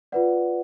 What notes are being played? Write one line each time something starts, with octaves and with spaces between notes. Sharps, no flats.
F4 B4 D5 F#5